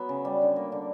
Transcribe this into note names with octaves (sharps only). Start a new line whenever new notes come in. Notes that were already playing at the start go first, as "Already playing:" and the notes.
Already playing: F#3 B3
C#3
G3
D3
A#3
D3